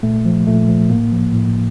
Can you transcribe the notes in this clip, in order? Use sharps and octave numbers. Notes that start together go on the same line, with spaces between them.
A#2 A3
F3
A#2 A3
F3
A2 A#3
F3
A2